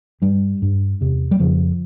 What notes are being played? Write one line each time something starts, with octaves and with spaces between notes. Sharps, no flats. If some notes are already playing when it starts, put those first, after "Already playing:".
G2 G3
G2
E2 C3
G3
F2 C#3 F3